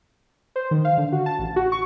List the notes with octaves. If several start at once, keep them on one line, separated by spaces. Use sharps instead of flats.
C5
D#3
F5
D3
F#4
A5
A1
F#4
C#6